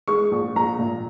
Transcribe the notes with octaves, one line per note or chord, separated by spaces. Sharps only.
G#3 C#6
A#1
A#1 A#5
A#2